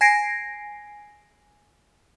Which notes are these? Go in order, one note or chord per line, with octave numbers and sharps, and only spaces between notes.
G#5 G#6 A#6 C7 D7